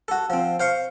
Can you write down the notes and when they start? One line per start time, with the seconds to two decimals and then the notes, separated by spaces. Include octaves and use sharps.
0.08 F#4 A4
0.30 F3 C4
0.60 C5 F5 C6 C#6